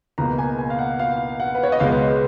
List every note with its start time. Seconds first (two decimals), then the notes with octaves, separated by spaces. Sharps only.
0.18 C#2 B2 A#3 A#5
0.38 G#5
0.58 G#5
0.70 F5
0.79 F#5
0.99 F5
1.40 F#5
1.55 B4
1.63 C#5
1.72 D#5
1.80 C#2 B2 G#3 B3 F5